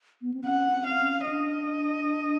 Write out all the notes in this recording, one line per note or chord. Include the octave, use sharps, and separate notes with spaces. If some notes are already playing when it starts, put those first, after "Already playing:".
B3
C4
C#4 F#5
C4
F5
C#4
D4 D#5